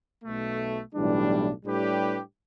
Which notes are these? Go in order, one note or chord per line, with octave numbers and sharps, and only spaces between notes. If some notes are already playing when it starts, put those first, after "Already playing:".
B1 B2 A3
B1 A2 E3 G3 D4
A2 G3 D4 G4 B4